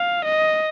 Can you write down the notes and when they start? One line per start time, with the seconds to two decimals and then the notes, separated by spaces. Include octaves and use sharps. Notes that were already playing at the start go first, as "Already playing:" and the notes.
Already playing: F5
0.25 D#5